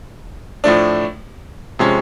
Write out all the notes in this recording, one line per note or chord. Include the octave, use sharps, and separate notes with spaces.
A2 F3 A3 D4
C3 F3 G#3 C#4